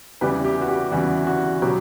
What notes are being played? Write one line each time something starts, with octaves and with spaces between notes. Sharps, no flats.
E2 C#3 E3 G3 G4 B4
G4
F#4
G4
E2 C#3 E3 G3 F#4
F#4
B2 F#3 B3 G4